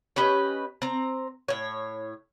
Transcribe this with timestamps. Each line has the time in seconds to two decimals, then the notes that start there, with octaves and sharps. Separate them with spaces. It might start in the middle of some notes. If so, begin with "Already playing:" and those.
0.16 C#4 G4 B4 D#5
0.82 C4 A#5
1.48 A2 C#5